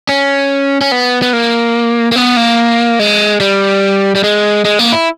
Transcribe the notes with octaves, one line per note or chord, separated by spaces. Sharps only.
C#4
C#4
B3
B3
A#3
A#3
B3
A#3
G#3
G3
G3
G#3
G#3
A#3
E4